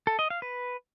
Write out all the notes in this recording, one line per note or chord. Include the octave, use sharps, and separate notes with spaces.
A4
D#5
F5
B4